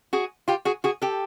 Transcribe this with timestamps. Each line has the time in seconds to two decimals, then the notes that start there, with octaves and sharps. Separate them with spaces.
0.13 F#4 G#4
0.48 F4 G4
0.65 F#4 G#4
0.84 F#4 G#4
1.02 G4 A4